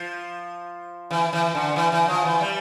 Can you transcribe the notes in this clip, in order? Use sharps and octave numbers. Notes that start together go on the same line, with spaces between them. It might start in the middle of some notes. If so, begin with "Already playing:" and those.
Already playing: F3
E3
E3
D3
E3
E3
F3
E3
G3